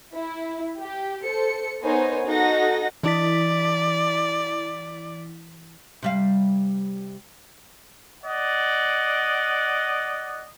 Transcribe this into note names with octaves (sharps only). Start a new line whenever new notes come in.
E4
G4
A4 C5 C#7
B3 D#4 A#4 C5 C#5 G#5
D#4 F#4 A4 D#5 F#5 A#6
E3 E4 D5 B6
C3 G3 F5
D5 D#5 F#5